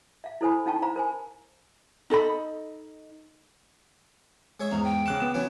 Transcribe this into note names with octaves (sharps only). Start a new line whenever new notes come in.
E5 F5
E4 A4 C5 G#5 B5
C#4 D#4 F5 G5 A5 C#6
C5 F5 A#5 B5
A#4 C5 G#5
D#4 A4 D#5 B5
G#3 C#5 E5
E2 G#2 A#5
G5
C#3 F#5 C6 D6 F#6 E7
B3 E7
E3 F#3 C#4